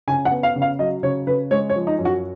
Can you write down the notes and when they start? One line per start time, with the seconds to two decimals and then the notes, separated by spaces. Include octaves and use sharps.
0.08 C#3 G#5
0.25 F#5
0.31 B3
0.43 F5
0.56 C#3
0.62 F5
0.79 F#3 D#5
1.03 C#3 C#5
1.27 C#3 B4
1.51 G#3 C#5
1.69 C#5
1.75 F3
1.87 D#4
1.99 F#2
2.05 F#4